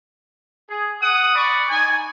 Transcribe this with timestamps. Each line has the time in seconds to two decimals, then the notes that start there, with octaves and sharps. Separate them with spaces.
0.69 G#4
1.02 F#5 D#6
1.35 D5 B5 C#6
1.69 D#4 G#5